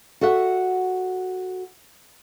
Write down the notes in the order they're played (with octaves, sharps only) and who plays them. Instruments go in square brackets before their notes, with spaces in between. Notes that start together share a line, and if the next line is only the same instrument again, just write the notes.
[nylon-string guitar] F#4 A4 E5 F#5